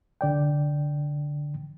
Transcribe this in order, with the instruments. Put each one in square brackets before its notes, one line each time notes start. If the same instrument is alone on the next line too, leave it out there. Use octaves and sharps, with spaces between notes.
[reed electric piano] C2 D3 D5 G5